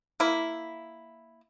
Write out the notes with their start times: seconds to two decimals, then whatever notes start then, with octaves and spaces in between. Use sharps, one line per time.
0.20 A#3 E4